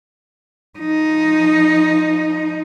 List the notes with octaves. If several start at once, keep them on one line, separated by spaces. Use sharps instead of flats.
F3 D#4